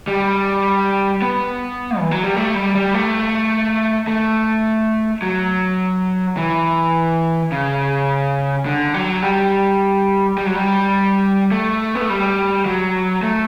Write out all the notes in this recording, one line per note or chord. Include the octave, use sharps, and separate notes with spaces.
G3
B3
E3
F#3
G3
A3
G3
G3
A3
A3
F#3
E3
C#3
D3
F#3
G3
G3
F#3
G3
A3
B3
A3
G3
F#3
A3